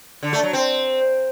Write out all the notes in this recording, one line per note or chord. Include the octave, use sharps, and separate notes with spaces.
D3
A3
F#3
C4